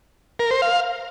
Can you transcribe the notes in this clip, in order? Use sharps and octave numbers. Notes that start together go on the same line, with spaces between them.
A#4
C5
F5